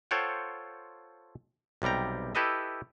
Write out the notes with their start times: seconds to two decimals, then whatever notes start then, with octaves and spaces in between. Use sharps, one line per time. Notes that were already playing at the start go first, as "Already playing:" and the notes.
0.11 F4 A4 C5 C#5 F#5 G5
1.82 B1 C3 G3 G5 A#5
2.35 E4 G4 A4 B4 D#5 E5